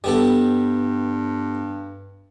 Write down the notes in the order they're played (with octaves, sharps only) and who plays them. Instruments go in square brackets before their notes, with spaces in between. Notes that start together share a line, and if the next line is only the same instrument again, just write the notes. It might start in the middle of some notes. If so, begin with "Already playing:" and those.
[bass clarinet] G2 [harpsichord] G3 B3 A4